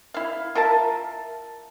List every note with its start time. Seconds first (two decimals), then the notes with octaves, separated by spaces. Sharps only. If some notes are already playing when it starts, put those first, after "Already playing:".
0.14 E4 F5
0.55 F4 A#4 E5 A5